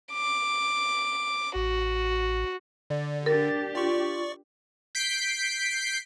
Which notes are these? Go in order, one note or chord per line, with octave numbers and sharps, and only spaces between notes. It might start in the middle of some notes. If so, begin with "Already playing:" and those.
D6
A1 F#4
D3 D5
D4 G4 A#4 A6
F4 D5 C#6
G6 B6 C7 D7